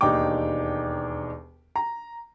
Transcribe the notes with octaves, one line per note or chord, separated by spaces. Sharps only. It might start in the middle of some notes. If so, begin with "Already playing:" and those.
E1 D#2 D4 D#4 G5 D6
A#5